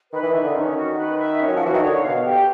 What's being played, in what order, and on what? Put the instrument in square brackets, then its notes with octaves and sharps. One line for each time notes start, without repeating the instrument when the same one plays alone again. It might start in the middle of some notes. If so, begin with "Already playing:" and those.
[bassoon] D#3 [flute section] B4
[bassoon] E3
[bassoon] D#3 [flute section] E5
[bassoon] D3
[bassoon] D#3 [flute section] C#4
[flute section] F#4
B4
E5
C#4
[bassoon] F#3
F3
[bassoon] E3 [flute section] F#4
[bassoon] D#3
[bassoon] D3 [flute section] C#5
[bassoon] B2 [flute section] F5
[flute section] G4